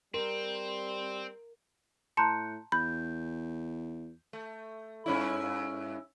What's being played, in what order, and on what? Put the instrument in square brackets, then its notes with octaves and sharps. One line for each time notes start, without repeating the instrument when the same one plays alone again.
[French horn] G3 [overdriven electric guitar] C4 [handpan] A#4
[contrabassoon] A2 [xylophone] A5 A#5 C6 [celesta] F#6 G6 C#7
[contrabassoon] E2 [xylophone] B5 [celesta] G6
[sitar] A3
G2 C#4 E4